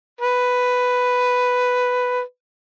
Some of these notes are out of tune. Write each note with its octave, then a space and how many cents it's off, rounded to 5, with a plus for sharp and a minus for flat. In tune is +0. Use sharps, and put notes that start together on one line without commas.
B4 +5